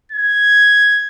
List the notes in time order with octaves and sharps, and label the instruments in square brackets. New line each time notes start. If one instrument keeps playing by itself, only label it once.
[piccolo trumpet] G#6